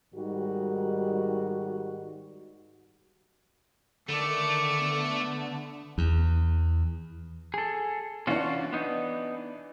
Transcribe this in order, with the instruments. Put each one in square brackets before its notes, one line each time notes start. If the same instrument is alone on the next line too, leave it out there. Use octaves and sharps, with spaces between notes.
[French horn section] G#2 D#3 G3 F#4
[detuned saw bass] D3 [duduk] D#3 [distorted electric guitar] A3 [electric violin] D5 C#7
[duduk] B3
[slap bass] E2
[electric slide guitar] G#4 A4
[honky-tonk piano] E3 D4 [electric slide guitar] C#4 F4 F#4
[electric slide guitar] B3 D#4